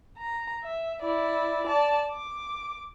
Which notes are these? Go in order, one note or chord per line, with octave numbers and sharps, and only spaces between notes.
A#5
E5
E4 D5
D5 A5
D6